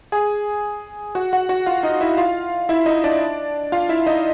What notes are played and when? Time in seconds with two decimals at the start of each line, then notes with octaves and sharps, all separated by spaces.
0.12 G#4 G#5
1.15 F#4 F#5
1.33 F#4 F#5
1.49 F#4 F#5
1.66 F4 F5
1.83 D#4 D#5
2.01 E4 E5
2.17 F4 F5
2.69 E4 E5
2.86 D#4 D#5
3.04 D4 D5
3.72 F4 F5
3.89 E4 E5
4.06 D#4 D#5